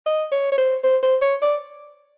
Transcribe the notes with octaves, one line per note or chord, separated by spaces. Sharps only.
D#5
C#5
C#5
C5
C5
C5
C#5
D5